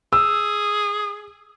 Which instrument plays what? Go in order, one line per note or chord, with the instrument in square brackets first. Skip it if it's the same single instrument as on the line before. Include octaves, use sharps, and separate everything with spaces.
[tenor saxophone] G#4 [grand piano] E6